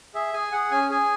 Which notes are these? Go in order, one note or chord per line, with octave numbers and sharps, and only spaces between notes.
G#4 E5
G#4 G#5
G#4 F#5
C#4 G#5
G#4 G#5